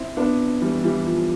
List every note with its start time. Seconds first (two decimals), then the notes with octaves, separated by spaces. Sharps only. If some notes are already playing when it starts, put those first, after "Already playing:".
Already playing: C4 E4
0.17 B3 D4
0.62 E3 G3
0.83 E3 G3
1.06 F3